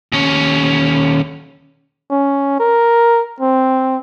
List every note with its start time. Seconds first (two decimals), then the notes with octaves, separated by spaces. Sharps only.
0.12 D#2 C#4
2.11 C#4
2.59 A#4
3.40 C4